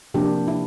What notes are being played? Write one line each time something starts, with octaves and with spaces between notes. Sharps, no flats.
C3 F3 A#3 D4 G4
E4